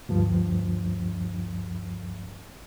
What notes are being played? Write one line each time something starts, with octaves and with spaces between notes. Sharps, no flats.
D2 G2 F3